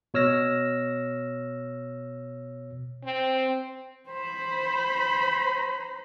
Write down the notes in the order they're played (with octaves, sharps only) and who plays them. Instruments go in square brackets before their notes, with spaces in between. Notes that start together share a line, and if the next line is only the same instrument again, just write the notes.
[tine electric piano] B2 C#5 E6 F6 A#6
[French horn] C4
[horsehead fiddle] C5 B5